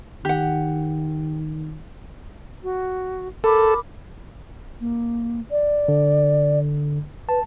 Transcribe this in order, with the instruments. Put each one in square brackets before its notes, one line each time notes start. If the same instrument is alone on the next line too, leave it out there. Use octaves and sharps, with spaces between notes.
[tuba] D#3 [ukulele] G4 F#5
[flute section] F#4
[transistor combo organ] A4 [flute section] A#4 B5 D6
[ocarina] A#3
D5
[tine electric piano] D3
[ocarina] B4 [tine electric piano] A5